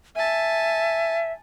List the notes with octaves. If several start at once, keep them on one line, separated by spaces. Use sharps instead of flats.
E5 G#5 A5